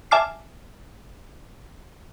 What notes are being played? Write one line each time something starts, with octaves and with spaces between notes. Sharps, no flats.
E5 G#5 A5 D6 F6 C7